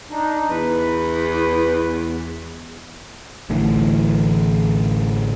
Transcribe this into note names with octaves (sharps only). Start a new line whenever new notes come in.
D4 D#4
E2 B4
A1 A2 D3 E3